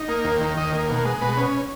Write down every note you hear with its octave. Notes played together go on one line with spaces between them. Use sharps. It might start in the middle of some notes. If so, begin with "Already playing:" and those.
Already playing: D#4
A#3
D#2
D#3
D#2 D#5
A#3
B2
G#3
B2 B4
C#4